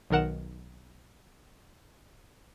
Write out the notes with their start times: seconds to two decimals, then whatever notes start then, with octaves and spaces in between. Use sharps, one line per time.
0.10 B1 D#3 A#4 F#5 E7